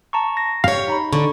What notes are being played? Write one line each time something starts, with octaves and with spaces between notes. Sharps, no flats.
A5 A#5 C#6
A#6
G4 C#5 F5
D#4 A#5 B5
D3 C#6